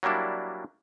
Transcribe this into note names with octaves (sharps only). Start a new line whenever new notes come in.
F#3 G3 A#3 D4 E4